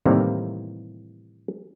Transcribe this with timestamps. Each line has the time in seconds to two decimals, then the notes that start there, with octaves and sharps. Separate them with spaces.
0.05 A2 C3 D#3 E3 G3 A#3